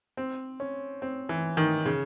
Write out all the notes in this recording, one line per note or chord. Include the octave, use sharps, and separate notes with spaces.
C4
C#4
C4
E3
D#3
C#3